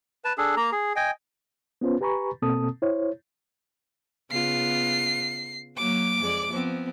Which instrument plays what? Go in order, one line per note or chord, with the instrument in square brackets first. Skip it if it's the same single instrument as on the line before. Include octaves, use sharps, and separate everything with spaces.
[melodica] B4 A5
D4 G#4 A4
A#3 A#5
G#4
D#5 G5 G#5
[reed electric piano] B3 C#4 F4 B4 C5
G4 B4 G#5 A#5 B5 C#6
B2 A#3 C4 A4 A5 D#6
E4 C5 C#5
[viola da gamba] C#3 B3 F4 [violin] C7
[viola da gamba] F#3 A#3 [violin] D6
[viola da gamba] F2 G#3 D5
F3 B3 C4